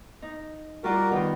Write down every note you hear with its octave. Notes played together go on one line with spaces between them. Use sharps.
D#4
G3 F4 F#4 A#4 D5
D#3 B3 F4